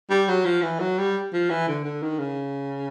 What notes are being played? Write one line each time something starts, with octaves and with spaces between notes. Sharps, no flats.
G3
F#3
F3
E3
F#3
G3
F3
E3
D3
D3
D#3
C#3